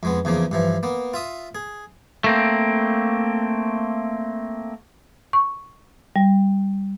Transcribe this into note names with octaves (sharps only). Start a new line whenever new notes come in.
F2 G#3 B3
E2 C#3 F3 A#3
G2 E3 F3
A#3 B3
F4 E5 D#6
G#4
A3 A#3 C4
C#6
G3